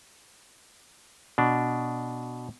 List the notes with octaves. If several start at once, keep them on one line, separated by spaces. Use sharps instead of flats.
B2 D4